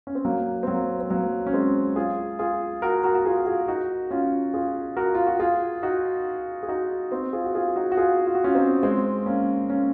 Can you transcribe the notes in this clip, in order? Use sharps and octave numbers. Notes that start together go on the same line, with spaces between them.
C#4
C4
F#3 A#3
C4
F#3 A#3
C4
F#3 A#3
C#4
G#3 C4
F4 G#4
F4 G#4
F#4 A#4
F#4 A#4
F#4
F4 G#4
F4 G#4
D#4 F#4
C#4 F4
F4 G#4
F#4 A#4
F4
F#4
F4 G#4
D#4 F#4
G#4
D#4 F#4
C4 D#4
F4 G#4
F#4
F4 G#4
D#4 F#4
F#4
F4 G#4
F4
F#4
C#4 F4
C4 D#4
G#3 C4
A#3 C#4
A#3 C#4